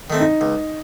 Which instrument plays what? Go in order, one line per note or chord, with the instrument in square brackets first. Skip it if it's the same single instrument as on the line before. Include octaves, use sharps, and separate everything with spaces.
[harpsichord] D#3 A3 C4
[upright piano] D#4
[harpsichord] C#2